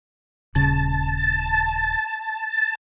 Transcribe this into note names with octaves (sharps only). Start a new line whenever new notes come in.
D#1 C#3 A5